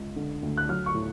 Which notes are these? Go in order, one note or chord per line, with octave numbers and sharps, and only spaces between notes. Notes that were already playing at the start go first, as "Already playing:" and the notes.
Already playing: C#2
D3
D2
F#6
F#3 F6
C#6
A2